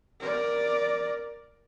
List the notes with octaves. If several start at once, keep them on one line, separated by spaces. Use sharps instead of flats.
A#4 D5